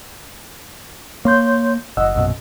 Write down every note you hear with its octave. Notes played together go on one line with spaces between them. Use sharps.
A#3 C#5 C6 G6
F#1 D#5 F#5 E6
A#1 F#2 B2